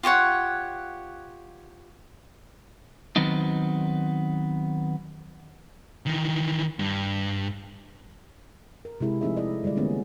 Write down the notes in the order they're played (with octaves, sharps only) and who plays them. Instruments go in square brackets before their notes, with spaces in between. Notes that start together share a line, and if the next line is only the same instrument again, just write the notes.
[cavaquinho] F4 G4 C#5 F#5
[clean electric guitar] D#3 F#3 B3 C4 D#4
[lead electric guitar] D#3 E3
G2
[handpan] A#4
C3 G#3 E4 G#4
F3 A3 C4 D#4 G#4 E5
E4 A4 D5 D#5
D3 G3 G#3 F4 D5
D3 E3 A#3 B3 C#4